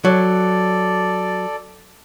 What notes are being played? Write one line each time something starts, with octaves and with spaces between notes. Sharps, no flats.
F#3 A4 D5